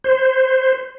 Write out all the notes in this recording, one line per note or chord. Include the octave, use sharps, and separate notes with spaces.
C5